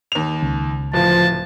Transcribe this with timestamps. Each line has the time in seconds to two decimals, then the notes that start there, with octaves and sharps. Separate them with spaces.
0.12 D#2 F7
0.42 C#2
0.93 D1 F3 A5